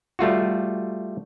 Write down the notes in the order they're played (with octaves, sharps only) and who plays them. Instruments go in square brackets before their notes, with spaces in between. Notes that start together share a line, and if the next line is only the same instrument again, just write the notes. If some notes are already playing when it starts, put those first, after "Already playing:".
[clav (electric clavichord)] G3 A3 F4 F#4